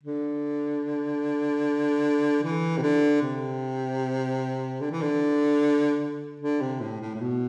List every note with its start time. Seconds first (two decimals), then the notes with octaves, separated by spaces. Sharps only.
0.03 D3
2.43 E3
2.77 C3
2.82 D3
3.22 C3
4.81 D3
4.91 E3
5.02 D3
6.40 D3
6.60 C3
6.81 A2
7.01 A2
7.15 A2
7.20 B2